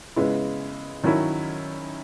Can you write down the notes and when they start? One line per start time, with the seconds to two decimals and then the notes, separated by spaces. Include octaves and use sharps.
0.16 C#3 G#3 B3 E4
1.03 D#3 F#3 C#4 E4